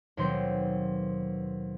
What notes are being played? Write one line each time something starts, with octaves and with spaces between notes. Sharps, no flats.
D#2 B2 F#3 C4 C6 G6